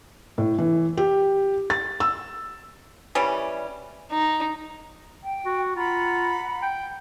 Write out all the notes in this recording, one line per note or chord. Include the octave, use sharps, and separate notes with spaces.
A2
E3
G4
A6
E6
E3 G3 C#4
D#4
G5
F#4
F4 F#5 A#5 B5
G5